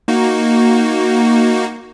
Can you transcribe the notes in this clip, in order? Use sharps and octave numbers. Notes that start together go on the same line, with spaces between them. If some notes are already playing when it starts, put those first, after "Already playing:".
A#3 D#4 F#4